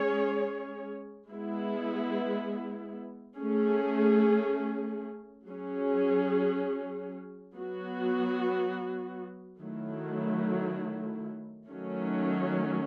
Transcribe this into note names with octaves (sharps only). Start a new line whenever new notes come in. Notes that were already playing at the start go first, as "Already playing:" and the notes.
Already playing: G#3 C#4 G#4 C#5
G#3 B3 E4
A3 C#4 G#4
F#3 C#4 G#4
F#3 B3 F#4
D#3 F#3 A3 E4
D#3 F#3 A3 C#4